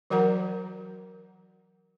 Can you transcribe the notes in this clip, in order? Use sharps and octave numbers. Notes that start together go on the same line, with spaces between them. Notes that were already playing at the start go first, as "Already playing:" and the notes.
E3 F#3 F#4 A#4 F#5 A#5